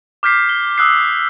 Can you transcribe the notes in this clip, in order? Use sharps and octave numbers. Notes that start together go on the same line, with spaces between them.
D6 F6 G6 B6 C7
G7
D#6 E6 F#6 C7